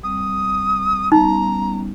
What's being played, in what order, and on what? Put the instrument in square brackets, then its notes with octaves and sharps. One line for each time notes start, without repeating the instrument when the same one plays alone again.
[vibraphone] G3 C4 [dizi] D#6
[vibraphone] G3 B3 C#4 [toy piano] D#4 [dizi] A#5